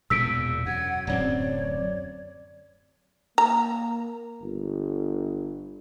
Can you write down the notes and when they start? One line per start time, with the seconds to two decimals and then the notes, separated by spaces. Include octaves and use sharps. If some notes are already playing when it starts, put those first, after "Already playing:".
0.10 E1 E2 A#2 E6 B6 D7
0.66 F#2 F#5 G#6
1.07 D1 F#2 C4 C#5 D5
3.38 A#3 A#5
4.42 G1